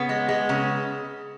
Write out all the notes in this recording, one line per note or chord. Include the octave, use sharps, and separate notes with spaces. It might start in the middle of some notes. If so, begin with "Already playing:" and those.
Already playing: C#3 B3
G#3
G#3
C#3